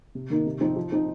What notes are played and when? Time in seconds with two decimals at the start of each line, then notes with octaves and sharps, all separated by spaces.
0.15 C3
0.30 D#3 A#3 D#4
0.46 C3
0.61 F3 C4 D#4
0.76 F3
0.92 C4 D#4